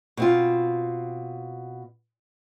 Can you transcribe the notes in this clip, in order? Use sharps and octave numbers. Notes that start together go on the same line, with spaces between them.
B2 C4 F4